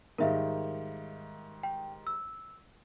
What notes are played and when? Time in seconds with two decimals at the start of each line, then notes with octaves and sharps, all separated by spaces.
0.18 G#2 D#3 G3 A#4 E5 F5
1.63 G5
2.07 E6